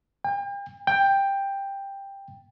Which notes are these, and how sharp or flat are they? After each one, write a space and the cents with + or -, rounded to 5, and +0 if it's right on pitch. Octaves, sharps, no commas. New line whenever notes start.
G5 +40
G5 +10